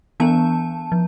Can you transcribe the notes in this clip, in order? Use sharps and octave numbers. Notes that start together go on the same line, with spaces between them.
E3 B3 D4 A5
F3